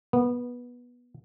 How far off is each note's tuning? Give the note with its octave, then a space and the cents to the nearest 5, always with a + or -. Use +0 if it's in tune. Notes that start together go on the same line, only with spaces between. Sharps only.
B3 -15